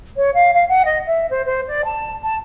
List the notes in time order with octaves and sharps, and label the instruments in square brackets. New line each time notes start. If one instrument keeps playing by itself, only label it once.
[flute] C#5
F5
F5
F#5
D#5
E5
C5
C5
D5
A5
A5